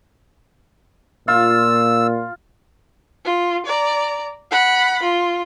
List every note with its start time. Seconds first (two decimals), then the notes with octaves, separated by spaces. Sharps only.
1.28 A#2 F4 E6
3.25 F4
3.66 D5 A#5
4.51 F#5 B5
5.03 F4